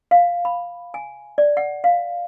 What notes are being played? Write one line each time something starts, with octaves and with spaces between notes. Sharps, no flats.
F5
B5
G#5
D5
F#5
F5